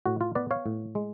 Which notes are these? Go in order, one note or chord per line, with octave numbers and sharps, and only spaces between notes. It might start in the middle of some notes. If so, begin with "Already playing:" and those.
A2 F#4
F4
B3 B4 D5
C#5 F5
A2
G#3